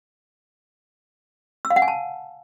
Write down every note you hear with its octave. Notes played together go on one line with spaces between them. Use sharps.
E6
F5
F#5
G#5
A5